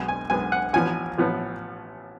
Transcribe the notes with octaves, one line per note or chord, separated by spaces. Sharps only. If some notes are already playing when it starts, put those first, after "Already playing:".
Already playing: B1 B2 G#3 B3
G#5
B1 B2 G#3 B3 G#5
F#5
A1 A2 F3 B3 G#5
A1 A2 F3 B3